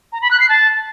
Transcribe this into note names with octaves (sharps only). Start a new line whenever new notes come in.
A#5
B5
F#6
C7
A5